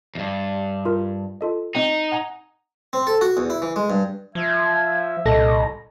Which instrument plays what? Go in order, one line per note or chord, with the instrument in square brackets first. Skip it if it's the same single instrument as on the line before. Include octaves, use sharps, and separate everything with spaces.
[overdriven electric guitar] E2 G2
[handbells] F4 A#4
F4 A4 D#5
[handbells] C4 D#5 G5 [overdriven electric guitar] D#4
[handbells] F#5 G#5 A#5
[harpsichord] C4
A4
F#4
E2
E4
E3
G#3
G2
[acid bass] F3 [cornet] E5 [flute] G#6
[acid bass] C2 [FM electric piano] A#2 A4 A#6 [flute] D#5